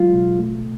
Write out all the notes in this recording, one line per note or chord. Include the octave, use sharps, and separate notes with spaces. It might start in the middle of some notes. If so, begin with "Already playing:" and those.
Already playing: F#3 G#3 F4
B2
A3